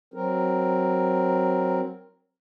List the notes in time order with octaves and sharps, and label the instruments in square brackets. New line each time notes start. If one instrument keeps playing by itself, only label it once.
[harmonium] F#3 C4 A#4